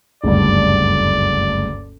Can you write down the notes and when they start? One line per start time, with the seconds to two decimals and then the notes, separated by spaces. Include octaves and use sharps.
0.24 F#1 D2 G2 D5